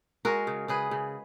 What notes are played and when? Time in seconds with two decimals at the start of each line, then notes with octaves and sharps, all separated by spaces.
0.25 G#3 F#4 A#4
0.47 C#3
0.68 C#3 G#4 B4
0.91 C#3